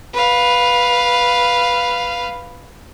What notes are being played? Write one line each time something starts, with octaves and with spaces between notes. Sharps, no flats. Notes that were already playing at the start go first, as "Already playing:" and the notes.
B4 F5